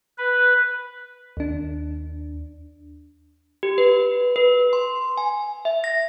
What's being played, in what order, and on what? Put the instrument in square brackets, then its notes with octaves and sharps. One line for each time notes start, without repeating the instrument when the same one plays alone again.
[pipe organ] B4
[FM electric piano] D#2 D4
[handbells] G4
B4
B4
C6
G#5
E5
A#6